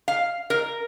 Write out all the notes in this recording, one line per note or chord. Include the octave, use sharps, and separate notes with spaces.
F5
A#4